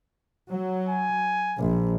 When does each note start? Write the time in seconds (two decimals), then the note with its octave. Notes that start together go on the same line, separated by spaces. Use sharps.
0.50 F#3
0.89 G#5
1.57 A#1